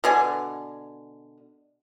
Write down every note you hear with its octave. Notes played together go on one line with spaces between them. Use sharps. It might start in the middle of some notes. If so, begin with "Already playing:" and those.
B2 D3 G#5